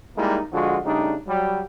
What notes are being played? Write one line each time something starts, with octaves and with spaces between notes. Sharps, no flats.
G3 G#3 A#3 D#4 E4
D3 F3 G#3 F4 F#4
C#3 G3 A3 D4 D#4
F#3 G3